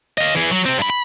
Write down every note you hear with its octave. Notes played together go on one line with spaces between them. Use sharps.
D#5 F5
E3 G#4
F#3
C3 C4
G2 B5
B5